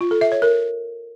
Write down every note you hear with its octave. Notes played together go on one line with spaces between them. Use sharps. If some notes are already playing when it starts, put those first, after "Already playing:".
F4
A4
E5
C#5
A#4